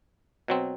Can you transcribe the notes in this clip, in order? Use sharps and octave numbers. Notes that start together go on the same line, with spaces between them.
B2 F#3 C4